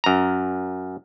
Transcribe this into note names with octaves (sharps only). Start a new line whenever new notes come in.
F#2 A#5